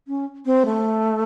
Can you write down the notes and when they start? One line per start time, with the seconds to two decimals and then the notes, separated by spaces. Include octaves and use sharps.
0.08 C#4
0.46 C4
0.66 A3